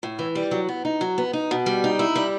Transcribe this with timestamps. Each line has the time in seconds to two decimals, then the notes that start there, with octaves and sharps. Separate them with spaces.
0.03 A2
0.19 E3
0.35 G3
0.51 F#3
0.69 B3
0.85 D#4
1.01 F#3
1.18 B3
1.33 D#4
1.51 B2
1.66 G3
1.84 D#4
1.99 E4
2.16 G3